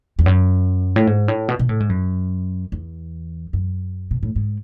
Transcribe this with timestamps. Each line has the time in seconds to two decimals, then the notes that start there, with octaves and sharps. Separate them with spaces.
0.19 E2
0.26 F#2
0.96 A2
1.07 G#2
1.28 A2
1.49 B2
1.59 B2
1.69 A2
1.80 G#2
1.89 F#2
2.72 E2
3.53 F#2
4.11 B2
4.23 A2
4.36 G#2